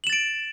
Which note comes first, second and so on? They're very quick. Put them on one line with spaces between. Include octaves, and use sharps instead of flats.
F#7 E7 A6 D7